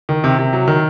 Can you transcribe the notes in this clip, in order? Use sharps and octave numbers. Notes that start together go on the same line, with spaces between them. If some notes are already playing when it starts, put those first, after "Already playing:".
D#3
C3
C3
F#3
D#3